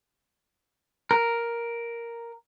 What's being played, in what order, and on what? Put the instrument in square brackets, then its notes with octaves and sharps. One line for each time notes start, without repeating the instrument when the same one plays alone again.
[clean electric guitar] A#4